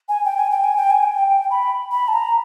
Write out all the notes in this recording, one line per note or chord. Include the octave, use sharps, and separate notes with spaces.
G#5
G5
G#5
G5
G#5
G5
G#5
G5
B5
B5
A5
A#5